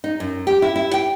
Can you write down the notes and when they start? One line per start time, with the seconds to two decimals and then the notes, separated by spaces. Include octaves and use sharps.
0.04 D#4
0.20 F#2
0.47 G4
0.62 E4
0.76 E4
0.94 G5